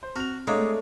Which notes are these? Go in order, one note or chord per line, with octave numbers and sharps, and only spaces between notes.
C5
C4 F#4 F6 F7
G#3 A3 D4 C#5 D#5 F5 A#5 D6